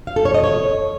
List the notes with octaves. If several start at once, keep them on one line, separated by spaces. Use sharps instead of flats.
F5
A4
C#5
D#5
C#5